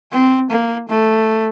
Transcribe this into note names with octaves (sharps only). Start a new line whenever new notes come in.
C4
A#3
A3